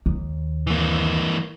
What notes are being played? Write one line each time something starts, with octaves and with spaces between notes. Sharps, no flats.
D#2
E3 A#3